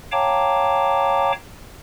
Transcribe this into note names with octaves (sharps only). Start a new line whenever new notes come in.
C#5 F5 G5 A5 A#5 D6